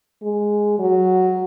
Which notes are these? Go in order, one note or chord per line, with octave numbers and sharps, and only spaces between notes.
G#3
F#3